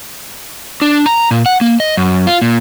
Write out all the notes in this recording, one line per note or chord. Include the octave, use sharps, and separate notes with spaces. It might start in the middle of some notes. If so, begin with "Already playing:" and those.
D4
A#5
A#2
F#5
A#3
D#5
F#2
F4
A#2